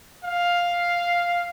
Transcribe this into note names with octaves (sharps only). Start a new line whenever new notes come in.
F5